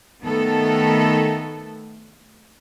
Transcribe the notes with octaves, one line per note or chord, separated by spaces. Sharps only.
D#3 A3 B3 A4